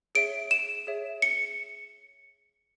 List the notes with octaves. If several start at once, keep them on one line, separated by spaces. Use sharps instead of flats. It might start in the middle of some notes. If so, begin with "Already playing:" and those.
G#4 C#5 E5 D7
E7
G#4 C#5 E5
C#7